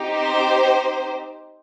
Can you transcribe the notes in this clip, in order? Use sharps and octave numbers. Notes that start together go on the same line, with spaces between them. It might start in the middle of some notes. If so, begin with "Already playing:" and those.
Already playing: C4 D#4 G4
C5